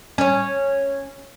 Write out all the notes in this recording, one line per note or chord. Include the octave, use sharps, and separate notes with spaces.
C#4 C#5